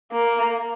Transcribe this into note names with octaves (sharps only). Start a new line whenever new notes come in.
A#3